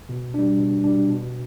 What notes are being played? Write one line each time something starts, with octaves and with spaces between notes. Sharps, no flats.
B2
G3 D4
B2
G3 D4
B2